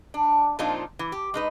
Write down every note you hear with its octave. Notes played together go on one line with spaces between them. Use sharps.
D4
A#2 F3 C4 D4 D#4 F4
E3
G4
G#3 D#4 B4